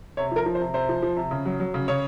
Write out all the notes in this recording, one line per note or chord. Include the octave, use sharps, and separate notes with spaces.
C3 C#5
F3 A#4
F3
C5
C3
C3 C5
F3
F3
C3
C#3
F#3
F#3
C#3
C#3 C#5